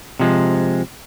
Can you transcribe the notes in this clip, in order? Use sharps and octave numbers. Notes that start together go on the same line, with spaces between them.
C3 F3 G#3